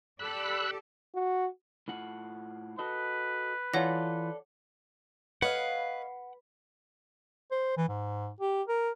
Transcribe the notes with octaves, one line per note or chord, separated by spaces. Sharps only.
G4 A4 D5 B5 E6 F#6
F#4
A2 F4 F#5
F#4 A4 B4 D#5
E3 F4 A4 C#5 D5 F#5 A#6
B4 C#5 D#5 F5 F#5
C5
E3
G#2
G4
A#4